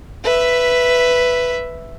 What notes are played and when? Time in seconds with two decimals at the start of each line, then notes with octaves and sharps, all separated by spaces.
0.23 B4 E5